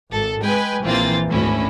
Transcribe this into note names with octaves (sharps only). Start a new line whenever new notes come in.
G#1 A4
G#3 B4 G5 G#5
A#1 E3 A#3 C4 F4 A6
G#1 D2 C#4 E4